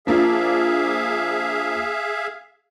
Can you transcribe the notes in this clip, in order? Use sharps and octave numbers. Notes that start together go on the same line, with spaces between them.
F3 A#3 D4 G#4 E5 F5